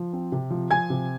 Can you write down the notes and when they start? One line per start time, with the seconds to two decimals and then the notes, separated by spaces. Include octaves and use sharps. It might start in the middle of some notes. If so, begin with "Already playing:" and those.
Already playing: F3
0.13 C4
0.32 C3
0.50 F3
0.71 F3 G#5 G#6
0.90 C3